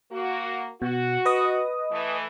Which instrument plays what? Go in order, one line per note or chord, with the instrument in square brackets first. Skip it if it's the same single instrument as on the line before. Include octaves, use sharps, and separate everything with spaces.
[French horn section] A#3 F#4
[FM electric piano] B2 [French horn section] F#4
[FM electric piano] B4 D#5 D#6
[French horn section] E3 A3